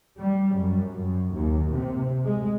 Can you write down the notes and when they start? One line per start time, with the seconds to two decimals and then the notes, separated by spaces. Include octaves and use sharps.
0.18 G3
0.54 F#2
0.92 F#2
1.33 D#2
1.73 C3
2.24 G#3